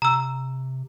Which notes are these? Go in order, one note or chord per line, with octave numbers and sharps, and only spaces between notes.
C3 A#5 E6